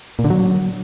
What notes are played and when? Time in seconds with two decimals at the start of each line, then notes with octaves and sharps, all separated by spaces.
0.19 A#2
0.24 D3
0.30 F#3